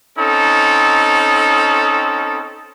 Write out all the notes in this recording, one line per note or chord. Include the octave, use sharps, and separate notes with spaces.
C4 C#4 D#4 A4